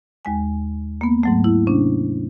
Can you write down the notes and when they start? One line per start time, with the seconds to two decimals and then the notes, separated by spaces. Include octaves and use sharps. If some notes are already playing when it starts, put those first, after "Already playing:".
0.25 D#2 G#3 G#5
1.01 A#3 B3
1.23 G#2 F#3 A3
1.44 E4
1.67 C3 C#4 D4